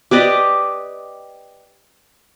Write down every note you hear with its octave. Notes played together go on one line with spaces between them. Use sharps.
G4 B4 D5 D#5